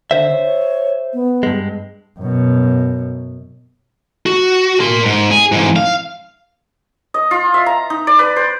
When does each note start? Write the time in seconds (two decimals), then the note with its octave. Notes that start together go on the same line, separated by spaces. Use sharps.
0.11 D3 C5 E5
0.32 C#5
0.45 C#5
1.14 B3
1.43 G2 G#3
2.20 F#2 B2
4.26 F#4
4.80 A#4 C6
5.06 G#2
5.31 G#4
5.52 G#2 E3
5.76 F5
7.14 D#5
7.31 F4
7.54 E5
7.66 A#5
7.90 D#4
8.07 D5
8.19 B4
8.36 C5